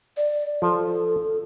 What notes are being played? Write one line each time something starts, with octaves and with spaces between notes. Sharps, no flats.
D5
F3 A4